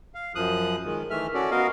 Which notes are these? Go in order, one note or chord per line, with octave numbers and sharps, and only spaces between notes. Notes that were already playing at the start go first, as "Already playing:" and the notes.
F5
F#2 F3 D#6 F#6
D#3 G#3
D#3 E3 A3 E5 F6
C#4 F#4 A4 D5
B3 F#4 A#4 D#5 F5